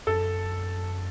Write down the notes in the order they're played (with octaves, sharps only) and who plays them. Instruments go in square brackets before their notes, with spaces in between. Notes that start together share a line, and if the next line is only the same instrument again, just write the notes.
[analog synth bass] F#2 [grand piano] A4